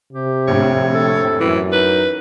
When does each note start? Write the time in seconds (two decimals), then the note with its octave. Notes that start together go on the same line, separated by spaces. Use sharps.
0.13 C3 G4
0.48 A#1 F2 A2 C#5
0.95 A4
1.40 F#2 E3
1.73 D#4 B4